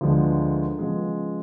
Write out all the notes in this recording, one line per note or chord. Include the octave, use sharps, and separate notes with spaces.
D2 D3 F3 G#3 B3
C#3 F3 G#3 B3